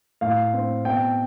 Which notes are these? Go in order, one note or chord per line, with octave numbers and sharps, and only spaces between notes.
A2 F5
C4
B2 G5